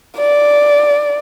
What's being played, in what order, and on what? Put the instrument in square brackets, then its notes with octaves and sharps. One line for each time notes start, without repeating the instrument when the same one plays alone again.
[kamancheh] D5